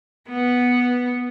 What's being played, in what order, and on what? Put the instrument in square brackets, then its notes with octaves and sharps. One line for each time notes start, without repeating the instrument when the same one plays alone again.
[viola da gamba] B3